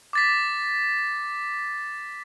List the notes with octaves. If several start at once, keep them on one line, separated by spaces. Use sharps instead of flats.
D6 A6 B6